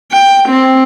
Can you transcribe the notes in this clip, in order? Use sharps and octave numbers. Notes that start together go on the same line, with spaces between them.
G5
C4